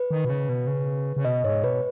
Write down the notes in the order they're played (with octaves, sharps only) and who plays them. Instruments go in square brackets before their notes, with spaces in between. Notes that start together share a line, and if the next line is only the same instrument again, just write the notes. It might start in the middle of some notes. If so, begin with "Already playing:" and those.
Already playing: [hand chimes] B4
[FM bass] D#3
B2
C#3
B2
C#3
C#3
[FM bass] B2 [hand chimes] D#5
[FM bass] G#2 [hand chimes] C#5
[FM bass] B2 [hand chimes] B4